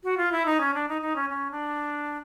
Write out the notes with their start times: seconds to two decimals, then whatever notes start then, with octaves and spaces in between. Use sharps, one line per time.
0.04 F#4
0.17 F4
0.32 E4
0.46 D#4
0.61 C#4
0.74 D4
0.89 D#4
1.02 D#4
1.16 C#4
1.30 C#4
1.51 D4